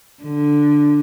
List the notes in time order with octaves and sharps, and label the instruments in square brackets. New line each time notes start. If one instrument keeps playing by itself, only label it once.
[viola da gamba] D3